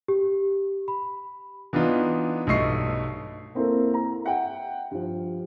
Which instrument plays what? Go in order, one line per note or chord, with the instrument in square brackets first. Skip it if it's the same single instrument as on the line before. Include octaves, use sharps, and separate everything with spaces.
[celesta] G4
B5
[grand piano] E3 B3 D4 D#4 F4
B1 G2 A3 D#5 C#6 C7
[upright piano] A#3 C4 E4 A4 A#4
A#5
E5 F#5 G5
G2 F3